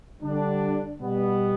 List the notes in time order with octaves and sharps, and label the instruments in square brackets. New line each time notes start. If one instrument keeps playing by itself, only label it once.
[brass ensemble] D3 G3 D4
B2 G3 B3